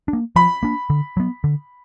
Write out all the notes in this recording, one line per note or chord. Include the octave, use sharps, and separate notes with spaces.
D4
A#3
F3 B5
A#3 D4
D3
F#3 B3
D3